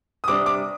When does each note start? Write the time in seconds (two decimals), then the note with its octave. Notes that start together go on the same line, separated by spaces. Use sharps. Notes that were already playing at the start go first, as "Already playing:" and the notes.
0.24 D#6
0.28 C3 G3 D4 D6
0.46 D6